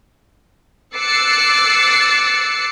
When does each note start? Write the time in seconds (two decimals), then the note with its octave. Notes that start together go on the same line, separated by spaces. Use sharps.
0.97 D6 E6 F#6 A6 C7 C#7